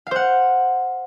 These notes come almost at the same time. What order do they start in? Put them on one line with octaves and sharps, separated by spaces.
F5 C5 F#5